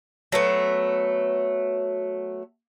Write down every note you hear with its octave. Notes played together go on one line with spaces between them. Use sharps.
F#3 A3 B3